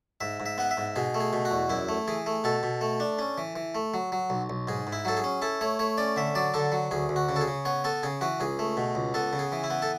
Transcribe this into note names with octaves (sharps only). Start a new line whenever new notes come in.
G#2 E5
G#2
E5
B3 F#5
E5
G#2
B2 G#4
A3
G#4
B2
F#4
E2
F#2 E4
A3
E3 G#4
A3
B2 A4
B2
A3
D4
C#4
E3
E3
A3
F#3
F#3
B1
B1
G#2 G#4
G#2
E4
F#3 A4
G#4
C#4
E4 A4
A3 C#5
A3 C#5
C#4 D5
D3 E5
F#3 D5
D3 A4
F#3
D2 G#4
D2
F#4
C#3
A4
G#4
C#3
B3 C#5
B3 A4
C#3 G#4
E3 F#4
C#2 G#4
A3
B2
C#2
B3 A4
C#3
G#4
E3
E4
B3
A4